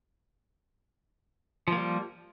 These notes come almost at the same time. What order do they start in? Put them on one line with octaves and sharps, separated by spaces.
F3 A#3 G3